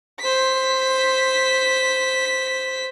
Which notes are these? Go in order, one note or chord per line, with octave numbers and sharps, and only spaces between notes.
C5 B6